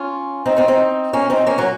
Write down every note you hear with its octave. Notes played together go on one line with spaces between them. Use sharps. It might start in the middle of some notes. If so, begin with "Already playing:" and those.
Already playing: C#4 F4
C4 D#4
C4 D#4
C4 D#4
A#3 C#4
C4 D#4
A#3 C#4
F#3 A#3